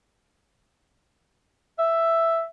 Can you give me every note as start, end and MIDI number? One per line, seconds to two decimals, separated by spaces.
1.79 2.43 76